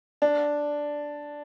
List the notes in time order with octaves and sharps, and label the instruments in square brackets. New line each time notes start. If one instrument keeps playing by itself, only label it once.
[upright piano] D4